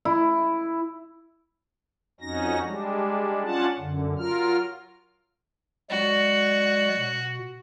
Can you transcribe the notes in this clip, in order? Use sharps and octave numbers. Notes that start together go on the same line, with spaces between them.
E4
F2 C#4 D#4 F#4 A#6
G3 G#3 D4
C#4 D4 F4 F#5 A5
F#2 D3
F#3 F4 A#4 F6
F#3 G#3 F#4 D5
B2